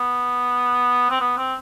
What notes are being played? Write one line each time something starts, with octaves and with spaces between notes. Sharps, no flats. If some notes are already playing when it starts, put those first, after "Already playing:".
Already playing: B3
C4
B3
C4